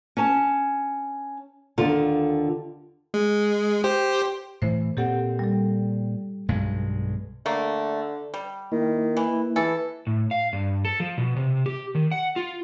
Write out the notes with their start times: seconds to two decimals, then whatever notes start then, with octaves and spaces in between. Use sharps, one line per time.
0.17 C#4 A5
1.78 D#2 D3 F4 A4
3.14 G#3
3.84 G4 C5
4.62 A2 E3 C5
4.97 A#2 C4 G4 A4 F#5
5.39 G3 A4
6.49 B1 G2 G#3
7.46 D3 A3 A#3
8.34 G3
8.72 D#3 A#3 E4
9.17 E3
9.56 E3 G#4 A4
10.07 A2
10.31 F5
10.53 G2
10.85 A4
11.00 F3
11.18 B2
11.36 C3
11.66 G4
11.95 D#3
12.11 F#5
12.36 F4